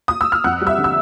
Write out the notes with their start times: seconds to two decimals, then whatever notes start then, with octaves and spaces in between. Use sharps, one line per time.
0.08 D#6
0.21 E6
0.32 F6
0.44 F2 F#5 F#6
0.61 G3
0.67 E5 E6
0.78 D3
0.84 E6